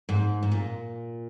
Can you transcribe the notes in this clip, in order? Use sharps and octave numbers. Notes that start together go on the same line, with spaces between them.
G#2
G#2
A#2